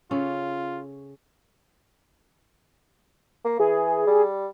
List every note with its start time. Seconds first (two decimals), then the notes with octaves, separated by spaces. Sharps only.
0.11 C#3 C#4 F4 A4
3.45 A#3
3.59 E3 G#4
4.07 G3